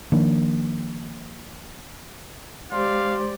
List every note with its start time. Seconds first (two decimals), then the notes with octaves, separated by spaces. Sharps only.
0.12 D#3 F3 A#3 D4
2.71 G#3 G4 C5 D5 F5 C6